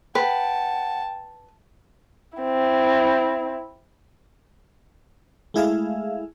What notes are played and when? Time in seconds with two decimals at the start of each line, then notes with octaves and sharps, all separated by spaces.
0.15 B4 F#5 G5 A5
2.38 C4 E4
5.54 G#3 A3 E4 G#4 E5 F5